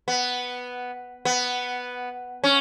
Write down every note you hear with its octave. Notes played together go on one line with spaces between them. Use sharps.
B3
B3
C#4